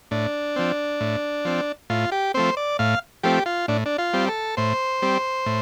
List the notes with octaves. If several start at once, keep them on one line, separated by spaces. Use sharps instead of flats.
A2 D4
F3 C4
A2
F3 C4
A2 F4
G4
F3 A3 C4 C5
D5
A2 F5
F3 A3 C4 G4
F4
A2 D4
D4
F4
G3 C4
A4
A2 C5
G3 C4
A2